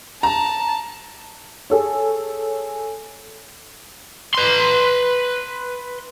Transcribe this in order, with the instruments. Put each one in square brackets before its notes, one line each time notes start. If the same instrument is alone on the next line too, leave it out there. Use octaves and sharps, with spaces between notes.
[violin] A5 [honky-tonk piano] A#5
[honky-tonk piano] G#4 A4 C#5
[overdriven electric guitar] B4 C6